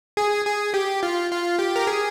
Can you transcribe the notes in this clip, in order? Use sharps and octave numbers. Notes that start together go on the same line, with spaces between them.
G#4
G#4
G4
F4
F4
G4
A#4
G#4